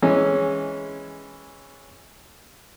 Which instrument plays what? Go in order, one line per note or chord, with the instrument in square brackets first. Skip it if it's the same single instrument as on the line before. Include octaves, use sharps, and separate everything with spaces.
[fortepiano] E3 G#3 C#4